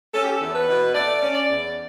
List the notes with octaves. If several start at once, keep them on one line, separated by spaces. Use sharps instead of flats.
C#4 A4
G4
A4
E2
B4
B2
A3 D5
C#4
D5
E2